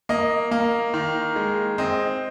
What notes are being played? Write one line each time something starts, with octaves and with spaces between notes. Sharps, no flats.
A#3 D#5
A#3 F5
D#3
G#3
C4 D#5